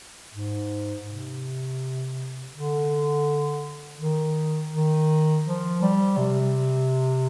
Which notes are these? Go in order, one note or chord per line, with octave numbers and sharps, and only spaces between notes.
G#2
C3
D3
D#3
D#3
F3
G3
C3